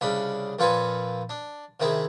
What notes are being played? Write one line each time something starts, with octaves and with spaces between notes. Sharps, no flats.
C2 C#3 D4 B5
F2 A#2 F4 A4 B4 G#5
D4
C3 D#3 E4 G#4